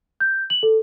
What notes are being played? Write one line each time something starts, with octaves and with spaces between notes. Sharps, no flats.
G6
F#7
A4